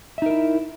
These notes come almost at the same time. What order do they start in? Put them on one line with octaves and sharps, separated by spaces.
E5 D#4 A#4 E4